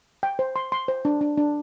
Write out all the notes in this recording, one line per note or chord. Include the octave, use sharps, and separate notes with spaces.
G5
C5
C6
C6
C5
D4
D4
D4